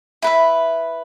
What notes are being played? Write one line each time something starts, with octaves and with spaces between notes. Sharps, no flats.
E4 B4 E5